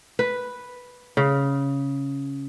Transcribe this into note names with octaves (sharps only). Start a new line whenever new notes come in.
B4
C#3